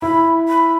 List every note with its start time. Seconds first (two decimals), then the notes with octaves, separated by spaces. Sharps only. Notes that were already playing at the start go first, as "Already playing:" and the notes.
0.02 E4 B5
0.49 B5